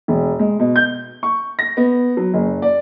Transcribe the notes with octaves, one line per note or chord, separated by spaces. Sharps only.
E1
G#3
B2
G6
C#6
A#6
B3
F#3
F#1
D5